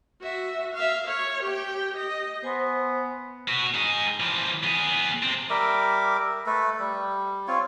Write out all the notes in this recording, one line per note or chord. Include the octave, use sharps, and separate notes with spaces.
F#4 E5
E5 F5
C#5
G4 G5
D#5
B3 C5 G#5 C6
B3 F#4
D#4 G#4
E3 F3
B3 G#4
C3 C4
G3 A#4 E5 D6
A3 A4 B4
G3
C4 F4 C#5